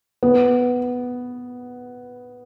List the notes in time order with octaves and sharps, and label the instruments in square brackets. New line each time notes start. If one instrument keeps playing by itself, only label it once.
[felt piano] B3